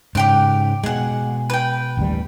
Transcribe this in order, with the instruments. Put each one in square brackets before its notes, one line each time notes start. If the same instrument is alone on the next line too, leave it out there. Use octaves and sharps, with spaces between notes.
[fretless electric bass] G#2 C#3 [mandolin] G4 G5 F#6
[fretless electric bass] B2 G#3 [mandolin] G#4 F#5
[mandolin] B4 G5
[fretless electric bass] A1 D#2 G3